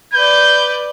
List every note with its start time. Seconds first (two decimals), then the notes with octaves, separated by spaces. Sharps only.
0.14 B4 D5 G6